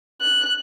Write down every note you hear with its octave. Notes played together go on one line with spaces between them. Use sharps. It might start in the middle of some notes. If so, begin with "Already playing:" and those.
F#6